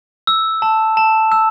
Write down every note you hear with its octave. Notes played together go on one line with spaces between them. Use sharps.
E6
A5
A5
E6